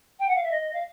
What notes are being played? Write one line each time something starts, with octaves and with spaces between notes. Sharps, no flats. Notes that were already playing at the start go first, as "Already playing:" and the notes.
G5
F#5
F5
E5
D#5
F5